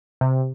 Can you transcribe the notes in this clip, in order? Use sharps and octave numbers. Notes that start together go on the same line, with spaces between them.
C3